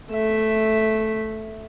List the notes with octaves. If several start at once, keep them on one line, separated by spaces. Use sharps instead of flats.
A3 E5